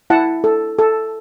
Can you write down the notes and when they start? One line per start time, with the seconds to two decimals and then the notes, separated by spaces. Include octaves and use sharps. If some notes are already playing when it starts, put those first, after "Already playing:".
0.10 E4 F#5 A5
0.44 A4
0.79 A4